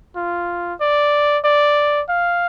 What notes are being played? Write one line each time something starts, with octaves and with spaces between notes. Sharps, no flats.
F4
D5
D5
F5